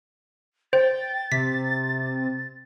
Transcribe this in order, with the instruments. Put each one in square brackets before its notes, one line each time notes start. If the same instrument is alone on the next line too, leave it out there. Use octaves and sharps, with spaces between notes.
[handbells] C5 [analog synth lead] G5 [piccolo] A6
[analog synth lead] C3 [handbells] B6